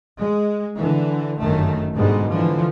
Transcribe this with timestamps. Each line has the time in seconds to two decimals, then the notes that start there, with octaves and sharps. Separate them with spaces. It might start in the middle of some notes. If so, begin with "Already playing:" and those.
0.18 G#3
0.76 D3 E3
1.39 G1 F#2 D#3 A3
1.95 G#2 B2 D3 G3 G#3
2.29 D3 E3 F3